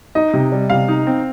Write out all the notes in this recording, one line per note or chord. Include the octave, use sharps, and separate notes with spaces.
D#4 D#5
C3
G3
C3 F5
D#4
C4